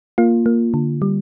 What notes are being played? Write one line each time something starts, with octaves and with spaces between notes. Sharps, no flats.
A#3 F4
A#3
D3
G3